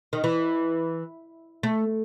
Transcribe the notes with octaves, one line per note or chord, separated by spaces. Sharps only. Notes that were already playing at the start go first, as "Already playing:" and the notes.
D#3
E3
A3